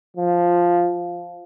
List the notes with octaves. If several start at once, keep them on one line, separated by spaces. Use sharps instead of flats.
F3